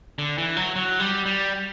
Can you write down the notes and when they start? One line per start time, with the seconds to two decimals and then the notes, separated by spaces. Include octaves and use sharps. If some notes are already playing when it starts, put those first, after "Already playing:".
0.19 D3
0.38 E3
0.56 F#3
0.76 F#3
1.00 G3
1.26 G3